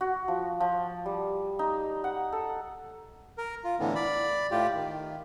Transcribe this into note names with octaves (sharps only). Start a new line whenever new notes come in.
F#4
F3
F3
G3
D#4
F#5
A4
A#4
F4
A2 D3 E3 B3
D5 B5
A2 F4 G4
D#3